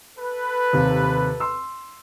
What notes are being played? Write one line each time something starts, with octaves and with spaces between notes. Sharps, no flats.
A4 B4
D#2 C3
C6 E6